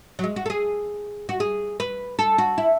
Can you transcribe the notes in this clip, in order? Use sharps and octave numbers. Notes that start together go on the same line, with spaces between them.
F#3
G#3
F#4
A4
G#4
F#4
G#4
B4
A4
F#4
E4